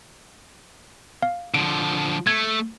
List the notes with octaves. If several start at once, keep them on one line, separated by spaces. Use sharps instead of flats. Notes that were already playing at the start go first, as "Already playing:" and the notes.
F5
D3 F3 D7
A3 G#6